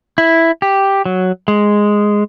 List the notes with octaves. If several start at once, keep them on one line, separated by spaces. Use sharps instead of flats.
E4
G4
F#3
G#3